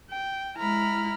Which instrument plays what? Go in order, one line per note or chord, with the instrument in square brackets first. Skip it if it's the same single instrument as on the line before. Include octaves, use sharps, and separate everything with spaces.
[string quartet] G5
G#3 E4 A#5 B5 F6